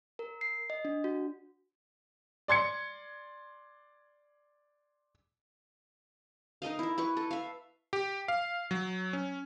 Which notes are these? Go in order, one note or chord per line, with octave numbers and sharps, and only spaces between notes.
A#4
C7
D#5
D4
F#4
D5 C6 G#6 C#7
D#4 A#4 D#5 F5
E4 E5
E4 B4 C#6
A4
E5 F5
G4
F5
F#3
C#4